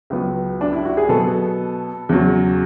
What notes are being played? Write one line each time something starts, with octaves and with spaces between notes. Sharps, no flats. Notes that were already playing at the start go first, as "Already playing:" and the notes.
C#2 C#3 F#3 B3
D4
E4
F#4
G#4
B2 F#3 B3 A4
E2 C#3 F#3